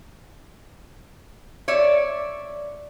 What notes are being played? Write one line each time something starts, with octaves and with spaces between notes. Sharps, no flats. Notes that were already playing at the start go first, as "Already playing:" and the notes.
C#5 D5 E5